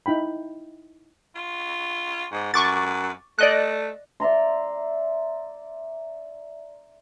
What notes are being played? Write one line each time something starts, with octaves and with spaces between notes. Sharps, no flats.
D#4 E4 G5 B5
F4
G#2
F#2 C#6 D6 A6
A3 D5 D#5 F#6
D5 E5 A#5 C6